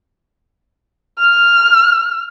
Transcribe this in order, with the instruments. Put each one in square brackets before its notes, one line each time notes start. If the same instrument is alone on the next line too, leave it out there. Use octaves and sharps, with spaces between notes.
[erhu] F6